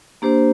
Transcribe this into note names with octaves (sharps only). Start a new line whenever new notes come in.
A#3 D4 G4 C5